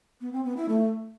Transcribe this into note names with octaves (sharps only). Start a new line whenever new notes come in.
B3
C4
B3
E4
A3